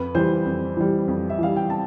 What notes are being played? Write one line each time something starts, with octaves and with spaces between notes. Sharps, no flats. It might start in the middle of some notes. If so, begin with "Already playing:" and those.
Already playing: F2 B4
E3 G3 C5
F2
E3 G3
F2
E5
E3 G3 F5
G5
A5